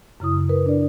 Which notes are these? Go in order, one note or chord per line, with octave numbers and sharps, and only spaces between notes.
F#2 C#3 E4 D#6
A#4 B4
D4 D5